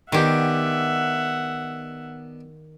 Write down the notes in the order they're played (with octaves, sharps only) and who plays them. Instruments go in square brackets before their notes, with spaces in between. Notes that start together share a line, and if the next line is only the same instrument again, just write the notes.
[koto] D#3 G4 [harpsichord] B3 D4 D#4 [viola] E5 F#5